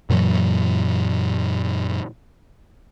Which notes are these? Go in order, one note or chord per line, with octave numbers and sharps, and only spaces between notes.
F#2 A#2 E3 F#3